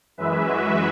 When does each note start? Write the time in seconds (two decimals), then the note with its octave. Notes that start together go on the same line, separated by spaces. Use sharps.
0.17 F#2 E3 G#3 B4 E5
0.46 F#4 B4